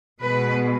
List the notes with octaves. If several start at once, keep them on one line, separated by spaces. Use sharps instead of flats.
B2 G#3 B4